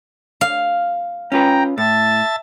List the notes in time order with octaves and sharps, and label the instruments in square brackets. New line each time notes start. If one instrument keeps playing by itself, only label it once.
[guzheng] F5
[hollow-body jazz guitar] C#4 F4 B4 [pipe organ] G5 A#5
[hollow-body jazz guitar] A2 [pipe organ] E5 A5 A6